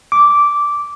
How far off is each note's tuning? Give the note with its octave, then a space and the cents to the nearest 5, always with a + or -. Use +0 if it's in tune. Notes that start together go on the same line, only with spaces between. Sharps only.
D6 -10